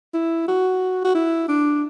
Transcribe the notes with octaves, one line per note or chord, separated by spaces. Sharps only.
E4
F#4
F#4
E4
D4